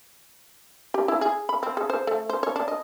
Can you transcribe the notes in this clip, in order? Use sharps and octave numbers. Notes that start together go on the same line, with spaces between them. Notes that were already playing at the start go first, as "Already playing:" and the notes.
G4
E4
G#4
B5
C4
G#4
C5
A3
C5
C#5
D4
D#5